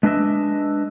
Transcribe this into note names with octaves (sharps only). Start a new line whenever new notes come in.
G#3 D4 B4 D#5 E5